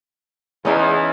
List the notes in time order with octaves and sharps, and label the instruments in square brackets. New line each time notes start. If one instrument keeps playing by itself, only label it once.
[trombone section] E2 [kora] C#4 D#4 G#4